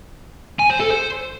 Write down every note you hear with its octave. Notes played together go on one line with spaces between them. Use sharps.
G#5
C5
A4
C5